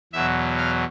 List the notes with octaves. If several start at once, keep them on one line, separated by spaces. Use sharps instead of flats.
E2 B2 F#3 E5
F5